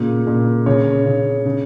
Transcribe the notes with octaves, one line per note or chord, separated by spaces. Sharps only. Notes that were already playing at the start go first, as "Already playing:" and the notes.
Already playing: A#2 C#3
A#2
C#3 C#5
C#3
C#3